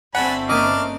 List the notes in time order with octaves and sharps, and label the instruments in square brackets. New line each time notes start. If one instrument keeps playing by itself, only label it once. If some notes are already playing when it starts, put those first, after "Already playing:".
[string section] G1 C4 [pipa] A3 F#5 [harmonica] D4 G#5 B5
[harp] A#3 C#4 D#5 [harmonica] D4 D6 F6